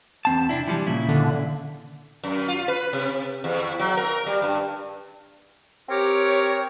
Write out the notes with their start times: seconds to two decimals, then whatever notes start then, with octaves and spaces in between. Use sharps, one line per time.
0.25 E2 C4 A5
0.49 C3 D4 E4
0.67 E3 F3 G3
0.87 A#2 C#3 E4
1.09 D3
2.24 F#2
2.48 F4
2.68 B4
2.93 C3
3.44 E2
3.79 F#3
3.97 A#4
4.26 G3
4.42 G2
5.89 C4 G4 A#4 C#5